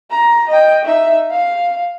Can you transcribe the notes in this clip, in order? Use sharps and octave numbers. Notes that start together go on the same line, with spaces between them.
A#5
D#5 G5
D#4 E5
F5